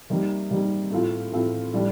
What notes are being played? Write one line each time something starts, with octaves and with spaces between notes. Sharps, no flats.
C3 G3 A#3 D#4
C3 G3 A#3 D#4
A2 A3 C4 F4
A2 A3 C4 F4
A2 G3 D4